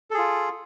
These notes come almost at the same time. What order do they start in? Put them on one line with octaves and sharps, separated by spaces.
A4 G#4 F4